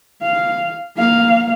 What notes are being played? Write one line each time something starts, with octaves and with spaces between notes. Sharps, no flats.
F5
A#3 F5